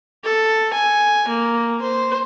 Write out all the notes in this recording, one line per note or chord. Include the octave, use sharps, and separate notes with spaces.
A4
G#5
A#3
C5